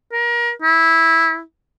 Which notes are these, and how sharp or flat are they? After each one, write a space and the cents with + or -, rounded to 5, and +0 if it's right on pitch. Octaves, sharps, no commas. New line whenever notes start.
A#4 +30
E4 -10